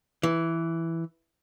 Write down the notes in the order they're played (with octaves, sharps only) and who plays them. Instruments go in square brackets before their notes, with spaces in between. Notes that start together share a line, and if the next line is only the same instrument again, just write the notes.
[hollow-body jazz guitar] E3